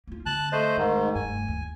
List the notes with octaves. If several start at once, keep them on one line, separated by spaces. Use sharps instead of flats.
A#3 F4
D3 C4 A5 F#6
A3 C5 D#5
E1 G#2 D#3 A3
F1 G2 G#5
D#2